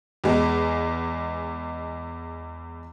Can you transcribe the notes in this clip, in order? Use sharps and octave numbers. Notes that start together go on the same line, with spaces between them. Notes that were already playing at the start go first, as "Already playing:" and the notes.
E2 G#3